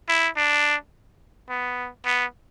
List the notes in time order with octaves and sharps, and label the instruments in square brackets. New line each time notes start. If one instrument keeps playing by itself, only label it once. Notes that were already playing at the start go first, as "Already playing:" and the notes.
[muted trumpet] E4
D4
B3
B3